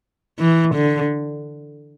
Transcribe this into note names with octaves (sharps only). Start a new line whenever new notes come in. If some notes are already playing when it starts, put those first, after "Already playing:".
E3
D3